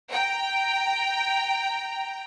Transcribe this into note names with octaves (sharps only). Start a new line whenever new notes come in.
G5 A#5